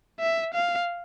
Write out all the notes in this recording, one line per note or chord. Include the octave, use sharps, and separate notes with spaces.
E5
F5